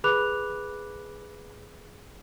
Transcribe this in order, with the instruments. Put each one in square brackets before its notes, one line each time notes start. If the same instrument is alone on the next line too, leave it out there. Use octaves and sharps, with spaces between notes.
[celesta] G#4 B4 B5 D6 F#6 F7